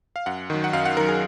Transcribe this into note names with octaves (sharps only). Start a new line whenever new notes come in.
F5
F#2 F#5
D#3 F#3
F#5
F#2 F5
F#5
D#3 F#3 A#4
G#4